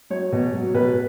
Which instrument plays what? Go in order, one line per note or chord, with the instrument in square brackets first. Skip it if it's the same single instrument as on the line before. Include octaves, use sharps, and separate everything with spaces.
[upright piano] F#3 C#5
B2
F#3
B2 B4